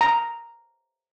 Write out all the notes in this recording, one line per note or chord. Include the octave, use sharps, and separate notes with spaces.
A#5